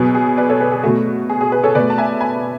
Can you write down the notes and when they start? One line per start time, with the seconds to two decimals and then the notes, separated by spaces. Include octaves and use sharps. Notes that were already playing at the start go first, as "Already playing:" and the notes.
Already playing: B2 F#3 B3 G#4 B4
0.15 G#4
0.37 B4 D5
0.49 A4 C#5
0.60 G#4 B4
0.72 G#4
0.83 B2 A3 F#4
1.29 G#4
1.41 G#4
1.52 G#4 B4
1.63 A4 C#5
1.75 B2 A3 B4 D5
1.90 A5
1.98 E5 G#5
2.21 G#5 B5